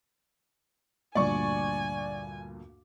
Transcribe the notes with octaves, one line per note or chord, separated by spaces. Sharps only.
D2 G2 A#2 D5 G#5 C#6